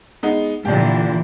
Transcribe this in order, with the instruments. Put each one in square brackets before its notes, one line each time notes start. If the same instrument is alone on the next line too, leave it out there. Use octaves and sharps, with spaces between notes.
[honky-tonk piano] G#3 B3 D#4
[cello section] A#2 D3 E3 [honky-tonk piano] D4 G4